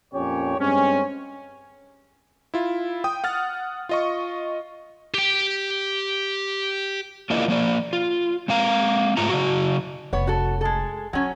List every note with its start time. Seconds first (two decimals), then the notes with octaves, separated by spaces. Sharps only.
0.13 F2 A#2 C#4 G4 C#5
0.58 G2 G#3 C4 C#4
2.54 E4 F4
3.04 G5 D#6
3.24 F#5 F6 A6
3.89 F4 D#5 C#6
5.14 G4 G5
7.30 A#3 D4 E4 F4 A#4 D#5
7.48 F3 A#3 D5
7.93 F4
8.48 G#3 C4 F5 A#5
9.17 G#2 A3 F4 E5 A#5
9.29 C#3 F#3 F#4
10.13 F1 B3 C#5
10.27 F#4 A4
10.61 G#3 A4
11.13 F#3 C#4 E4